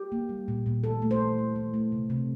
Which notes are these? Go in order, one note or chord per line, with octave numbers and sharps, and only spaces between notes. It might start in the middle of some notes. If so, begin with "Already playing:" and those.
Already playing: G4
A#3
G3
A#2
A#2
E3 A4
A3
C5
E3
A3
E3
A3
C3
C3